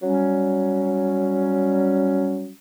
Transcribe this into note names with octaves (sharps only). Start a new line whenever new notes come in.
F#3 G3 C#4